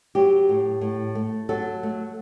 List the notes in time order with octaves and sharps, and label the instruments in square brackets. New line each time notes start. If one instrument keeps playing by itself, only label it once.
[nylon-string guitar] F#3 G4
A2
A2
A3
F#3 A4
A3